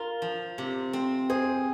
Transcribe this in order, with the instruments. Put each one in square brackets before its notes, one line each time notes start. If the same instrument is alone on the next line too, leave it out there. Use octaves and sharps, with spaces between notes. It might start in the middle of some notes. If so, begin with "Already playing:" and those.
Already playing: [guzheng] F4 [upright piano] A#4
[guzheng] F3
C3
C4
[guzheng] G#4 [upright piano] C5